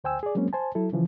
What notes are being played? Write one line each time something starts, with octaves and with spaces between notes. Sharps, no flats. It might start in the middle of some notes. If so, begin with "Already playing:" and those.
D2 C5 G5 G#5 E6
G#4 D5
F#3 G#3 A#3 C4 C#4
C5 G#5 A5
F#3 E4 A4
C#3 E3 F3